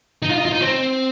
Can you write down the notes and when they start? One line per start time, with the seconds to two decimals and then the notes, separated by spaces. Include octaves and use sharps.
0.23 D#4
0.29 F4
0.38 D#4
0.45 F4
0.53 D#4
0.61 C4